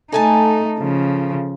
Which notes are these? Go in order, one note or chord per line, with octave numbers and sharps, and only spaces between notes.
A3 D#4 A4 G#5 A5
C#3 F3